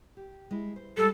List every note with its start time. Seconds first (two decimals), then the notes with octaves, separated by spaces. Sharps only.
0.17 G4
0.51 G#3 E4
0.76 C5
0.97 G3 G#3 A4